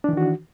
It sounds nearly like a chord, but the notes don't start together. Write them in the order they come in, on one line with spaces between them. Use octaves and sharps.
D4 E3 D#3 F#4